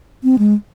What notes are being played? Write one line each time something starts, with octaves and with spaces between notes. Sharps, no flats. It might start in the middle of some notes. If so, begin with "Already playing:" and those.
C4
G#3